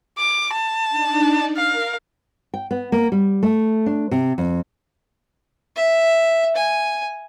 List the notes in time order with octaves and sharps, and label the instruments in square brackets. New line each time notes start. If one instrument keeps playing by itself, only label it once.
[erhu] D6
A5
[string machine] D4 D#4 D5
[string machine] A#4 [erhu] F5
[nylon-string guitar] G5
B3
A#3
G3
A3
D4
C3
F2
[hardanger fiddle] E5
G#5